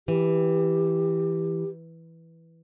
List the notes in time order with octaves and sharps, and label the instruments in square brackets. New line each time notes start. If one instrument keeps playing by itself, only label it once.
[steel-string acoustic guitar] E3 [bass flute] G4